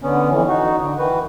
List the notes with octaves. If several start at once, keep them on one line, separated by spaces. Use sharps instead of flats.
D3 B3 C#4
F2 E3
D#4 F#4
D3
D#3 E3 F#4 B4